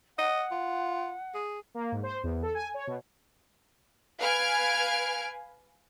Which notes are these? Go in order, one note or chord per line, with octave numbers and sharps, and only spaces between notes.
D#5 F#5
F4
G#4
A#3
G#2
C5
E2
A4
G#5
C#5
B2
B4 F5 G#5 F6 G#6 D7